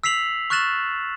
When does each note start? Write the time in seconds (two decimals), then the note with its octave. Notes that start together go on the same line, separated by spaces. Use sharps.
0.04 E6 B6 C7 F7 F#7
0.50 C#6 F6 F#6 A6 E7 F#7